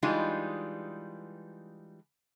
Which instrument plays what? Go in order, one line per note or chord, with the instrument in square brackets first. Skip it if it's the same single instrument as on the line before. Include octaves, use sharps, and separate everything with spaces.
[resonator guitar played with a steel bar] E3 G3 G#3 D4 D#4 F4